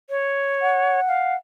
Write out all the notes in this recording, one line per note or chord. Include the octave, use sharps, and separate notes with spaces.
C#5
F#5
F5